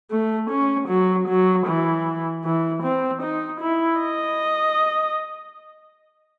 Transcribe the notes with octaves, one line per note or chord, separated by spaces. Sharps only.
A3
C#4
F#3
F#3
E3
E3
C4
D#4
E4
D#5